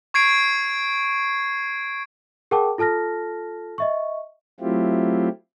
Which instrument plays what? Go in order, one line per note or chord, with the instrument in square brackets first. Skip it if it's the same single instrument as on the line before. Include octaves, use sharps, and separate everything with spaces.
[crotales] C#6 G#6 C7 D7
[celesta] G#4 A#4 F#5 G5 A5 D6
F4 A4 A5 F6 A#6
D#5 E5 C#6
[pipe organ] F#3 A3 C4 E4 F4 G4